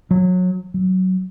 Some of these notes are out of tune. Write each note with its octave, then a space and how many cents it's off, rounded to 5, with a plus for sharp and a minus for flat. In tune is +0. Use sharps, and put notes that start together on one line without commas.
F#3 -25
F#3 +10